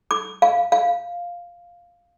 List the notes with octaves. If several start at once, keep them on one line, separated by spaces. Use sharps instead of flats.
D6
F5
F5